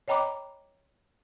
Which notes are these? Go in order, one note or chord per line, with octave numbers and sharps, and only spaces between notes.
C#5 D#5 G5 A#5 B5 D6